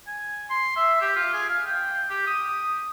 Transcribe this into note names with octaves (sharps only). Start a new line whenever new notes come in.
G#5
C6
E5
G4
F4
G#4
F5
G5
G4
D#6